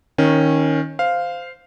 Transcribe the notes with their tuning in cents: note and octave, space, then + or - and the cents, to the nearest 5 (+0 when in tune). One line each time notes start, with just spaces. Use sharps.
D#3 +5 C#4 -15
C5 -15 F5 +0